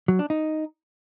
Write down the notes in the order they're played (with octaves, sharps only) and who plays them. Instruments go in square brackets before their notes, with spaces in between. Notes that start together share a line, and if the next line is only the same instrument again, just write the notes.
[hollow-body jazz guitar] F#3
D4
D#4